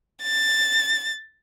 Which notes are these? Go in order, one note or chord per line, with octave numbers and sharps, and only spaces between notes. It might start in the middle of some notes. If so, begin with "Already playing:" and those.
A6